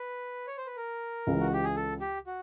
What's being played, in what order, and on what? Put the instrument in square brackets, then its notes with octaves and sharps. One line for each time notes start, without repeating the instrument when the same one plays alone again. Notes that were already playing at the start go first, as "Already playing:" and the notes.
Already playing: [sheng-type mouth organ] B4
C#5
C5
B4
A#4
[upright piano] C#2 C#3 E3
[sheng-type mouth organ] F#4
G4
G#4
A4
G4
F#4